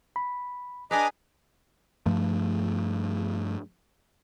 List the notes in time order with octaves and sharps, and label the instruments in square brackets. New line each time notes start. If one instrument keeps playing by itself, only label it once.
[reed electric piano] B5
[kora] D4 G#4 B4 [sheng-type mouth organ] D#5 A#5 D6 [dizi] G#5
[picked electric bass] G2 F3 A3